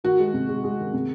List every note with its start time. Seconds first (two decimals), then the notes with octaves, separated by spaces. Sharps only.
0.04 D#3 F#4
0.19 G#3
0.34 C3
0.48 G#3
0.64 G#3
0.79 D#3
0.94 C3